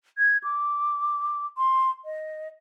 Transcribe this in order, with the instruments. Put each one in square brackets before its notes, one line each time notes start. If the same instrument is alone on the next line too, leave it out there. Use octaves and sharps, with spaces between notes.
[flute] G#6
D6
C6
D#5